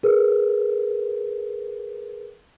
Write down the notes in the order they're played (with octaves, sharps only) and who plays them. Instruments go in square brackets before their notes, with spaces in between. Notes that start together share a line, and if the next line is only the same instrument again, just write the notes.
[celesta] G#4 A#4 B4